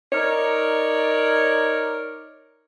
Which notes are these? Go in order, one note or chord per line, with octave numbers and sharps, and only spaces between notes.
D#4 A#4 C#5 D5